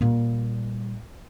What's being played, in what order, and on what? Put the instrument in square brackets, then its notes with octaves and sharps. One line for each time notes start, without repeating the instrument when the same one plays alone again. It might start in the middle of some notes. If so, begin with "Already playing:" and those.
[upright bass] A#2 G3